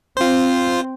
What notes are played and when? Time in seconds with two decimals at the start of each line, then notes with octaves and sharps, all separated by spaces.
0.17 C4 F4 C5